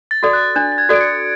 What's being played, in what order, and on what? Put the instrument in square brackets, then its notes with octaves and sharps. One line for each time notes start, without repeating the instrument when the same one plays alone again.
[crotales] A6
[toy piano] F#4 A4 D5
[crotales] F#6
[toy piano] D4 [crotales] F#6
[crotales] A6
G#6
[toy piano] F#4 A4 D5 [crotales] D7
[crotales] C#7